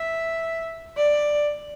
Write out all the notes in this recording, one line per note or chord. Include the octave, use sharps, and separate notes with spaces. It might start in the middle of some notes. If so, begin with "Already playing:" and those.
Already playing: E5
D5